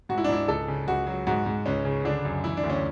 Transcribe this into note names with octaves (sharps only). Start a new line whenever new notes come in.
G#2 F#4
E4
D4
G#2 E4
C#2 A4
C#3
C#2 F#4
F#3
G#2 F#4
G#2
C#2 C#4
C#3
D3 D4
F#2
E3 E4
D4
D2
C#4